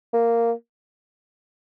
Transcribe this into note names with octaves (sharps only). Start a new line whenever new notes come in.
A#3